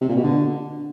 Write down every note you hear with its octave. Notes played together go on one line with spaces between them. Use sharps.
C3
A#2
B2
D3